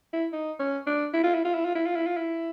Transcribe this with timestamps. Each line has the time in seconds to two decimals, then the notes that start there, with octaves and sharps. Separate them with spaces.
0.13 E4
0.32 D#4
0.59 C#4
0.87 D4
1.14 E4
1.23 F4
1.34 E4
1.45 F4
1.54 E4
1.65 F4
1.75 E4
1.86 F4
1.96 E4
2.07 F4
2.17 E4